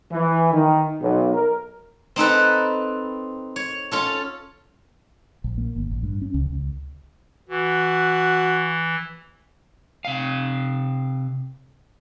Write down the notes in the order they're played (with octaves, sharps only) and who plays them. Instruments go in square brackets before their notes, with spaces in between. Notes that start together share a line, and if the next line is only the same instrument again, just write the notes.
[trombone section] E3
D#3
B1
A#4
[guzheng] C4 D#4 A4 B4
C#5
C#4 F4 A4
[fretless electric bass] A#1
A#3
G1
A1
G2
C#4
C#2
C#2
[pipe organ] E3 [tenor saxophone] F#4
[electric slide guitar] C3 F5